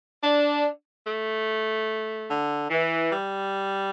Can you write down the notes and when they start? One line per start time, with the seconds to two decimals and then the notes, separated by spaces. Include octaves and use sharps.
0.24 D4
1.07 A3
2.30 D3
2.71 E3
3.12 G3